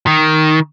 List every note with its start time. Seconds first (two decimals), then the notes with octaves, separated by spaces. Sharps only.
0.07 D#3